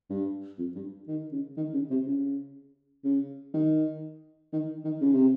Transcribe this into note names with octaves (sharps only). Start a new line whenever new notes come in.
G2
F2
G2
D#3
C#3
D#3
C#3
C3
C#3
C#3
D#3
D#3
D#3
C#3
C3